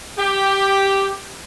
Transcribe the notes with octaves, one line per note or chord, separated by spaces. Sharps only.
G4